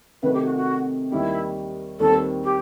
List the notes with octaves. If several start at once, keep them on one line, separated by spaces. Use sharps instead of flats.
C3 D#3 F#3 A3 B4
G4
F#4
F#4
D#2 D#3 G3 D#4 E4 G4
D#2 D#3 G3 C4 A4
G4